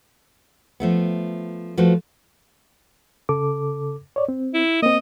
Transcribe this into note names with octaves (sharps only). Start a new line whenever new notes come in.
F3 A3 B3
F3 A3 F#4 B4 C5
C#3 A4 D6
C#5 D5
C4
E4
A#3 C4 D#5